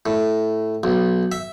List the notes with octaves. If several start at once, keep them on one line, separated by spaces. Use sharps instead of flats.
A2
B1
E5